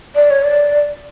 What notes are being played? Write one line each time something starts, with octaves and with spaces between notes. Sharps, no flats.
D5
C#5
D5